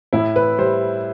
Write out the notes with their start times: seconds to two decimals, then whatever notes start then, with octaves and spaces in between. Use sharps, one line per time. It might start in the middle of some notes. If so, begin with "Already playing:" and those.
0.13 A2 E4
0.36 B4
0.58 G3 C5